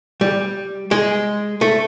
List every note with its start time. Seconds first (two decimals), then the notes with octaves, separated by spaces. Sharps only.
0.21 G3
0.91 G#3
1.61 A3